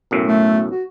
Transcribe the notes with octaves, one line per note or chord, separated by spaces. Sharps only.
B1 F#2 A2
A3
F#4